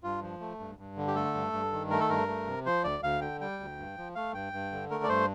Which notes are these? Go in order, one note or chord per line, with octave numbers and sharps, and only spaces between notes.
G2 F4
F3
A3
G2
G2
D3
G4
A3 A4
G2
G2
D#3
A3 A#4
A4
G2 A#4
A3
C3
F3 C5
D2 D5
D2 F5
D3 G5
G3 G5
D2
G2
F3
A3 F5
G2 G5
G2
D3
A3 A#4
D5
G2 C5